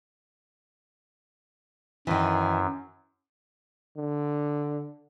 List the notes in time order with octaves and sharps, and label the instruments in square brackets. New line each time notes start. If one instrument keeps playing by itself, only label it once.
[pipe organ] F#2 [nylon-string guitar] D#3 E3
[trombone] D3